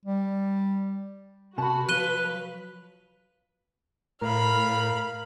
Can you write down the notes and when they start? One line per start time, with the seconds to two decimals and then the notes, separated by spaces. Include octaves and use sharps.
0.05 G3
1.58 C3 F#4 A5 B5
1.89 F3 F#3 F4 B4 F#6 D#7 G7
4.22 A2 A#4 F5 B5
4.70 A#4